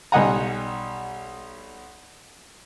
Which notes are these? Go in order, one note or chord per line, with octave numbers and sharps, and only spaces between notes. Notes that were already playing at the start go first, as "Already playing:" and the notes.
B1 G3 D#5 F#5 G#5 A#5